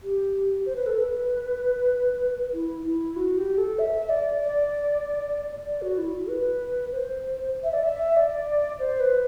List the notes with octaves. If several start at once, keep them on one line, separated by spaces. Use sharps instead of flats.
G4
C5
B4
A4
B4
E4
E4
F#4
G4
A4
E5
D5
D5
D5
F#4
E4
F#4
B4
C5
E5
D5
E5
D5
C5
B4